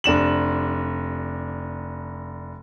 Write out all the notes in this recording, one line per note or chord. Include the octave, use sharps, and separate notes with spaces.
F1 D4 E7 F#7